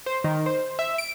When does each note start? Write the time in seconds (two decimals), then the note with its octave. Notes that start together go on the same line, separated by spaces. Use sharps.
0.06 C5
0.24 D#3
0.46 C5
0.79 E5
0.98 D7